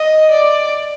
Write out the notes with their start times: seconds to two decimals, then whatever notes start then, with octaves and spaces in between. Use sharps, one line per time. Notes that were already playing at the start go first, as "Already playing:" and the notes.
Already playing: D#5
0.31 D5